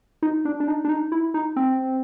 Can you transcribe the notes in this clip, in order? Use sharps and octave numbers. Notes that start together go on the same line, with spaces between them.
D#4
D4
D4
D#4
D4
D#4
E4
D#4
C4